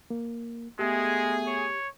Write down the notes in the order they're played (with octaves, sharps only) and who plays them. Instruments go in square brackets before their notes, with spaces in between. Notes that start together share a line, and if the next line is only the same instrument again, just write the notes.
[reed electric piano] A#3
[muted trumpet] G#3 [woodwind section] A3 B3 [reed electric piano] G4 [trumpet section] G#4
[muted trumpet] C#5